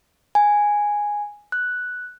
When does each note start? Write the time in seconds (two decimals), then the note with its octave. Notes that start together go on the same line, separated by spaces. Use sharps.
0.35 G#5
1.52 F#6